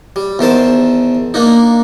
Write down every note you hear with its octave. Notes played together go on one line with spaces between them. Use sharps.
G3
E2 D#3 C5 A5
A#3 D4 D#4